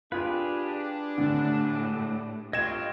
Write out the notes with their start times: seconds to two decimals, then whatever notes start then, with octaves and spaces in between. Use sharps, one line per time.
0.12 D4 F4 G4 G#4 B4
1.18 A2 D3
2.53 G2 F4 D#5 G5 C#6 G#6 E7